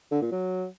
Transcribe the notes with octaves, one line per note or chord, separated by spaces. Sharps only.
D3
A#2
F#3